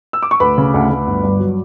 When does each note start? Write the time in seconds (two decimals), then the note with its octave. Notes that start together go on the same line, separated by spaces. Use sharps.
0.13 E6
0.22 D6
0.31 C#6
0.40 D2 B4 B5
0.58 C#3
0.74 D2
0.90 D2
1.07 G1
1.23 G2
1.39 F#3